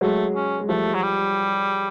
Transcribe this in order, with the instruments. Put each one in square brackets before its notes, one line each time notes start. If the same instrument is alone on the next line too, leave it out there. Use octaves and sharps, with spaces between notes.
[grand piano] F#3 G#3 [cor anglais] A3
[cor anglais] C#4
[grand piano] G#3
[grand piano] F3 G3 [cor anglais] A3
[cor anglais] F#3
G3